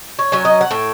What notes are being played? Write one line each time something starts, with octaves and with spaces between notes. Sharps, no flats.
C#5
F#3 C#4
D#5
F#5
A2 E5